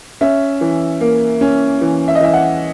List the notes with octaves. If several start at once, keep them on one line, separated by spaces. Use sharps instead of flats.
C#4 E5
E3
A#3
C#4
E3
E5
D#5
E3 E5
F#5